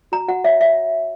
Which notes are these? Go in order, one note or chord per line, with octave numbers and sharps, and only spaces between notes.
F#4 A#5
F#4 F#5
C#5 E5
C#5 E5